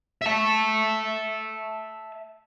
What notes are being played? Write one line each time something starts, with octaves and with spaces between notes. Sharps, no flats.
E5 A5